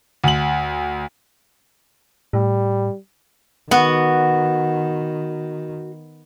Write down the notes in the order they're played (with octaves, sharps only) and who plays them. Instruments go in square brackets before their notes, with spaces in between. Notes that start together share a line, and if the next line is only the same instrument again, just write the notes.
[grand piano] D2 F#7
[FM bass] A2 [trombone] G3
[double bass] D#3 [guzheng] B3 [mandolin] F#4